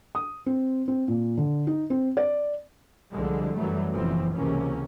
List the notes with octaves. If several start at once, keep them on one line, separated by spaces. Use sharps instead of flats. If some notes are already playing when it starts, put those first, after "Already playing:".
D#6
C4
C4
A#2
D3
D#4
C4
D5
C2 D3 F3 G3 G#3
F#2 E3 F#3 G3 A3
F#1 F2 B2 E3 F3 C4
C#2 C3 E3 F3 A#3 C#4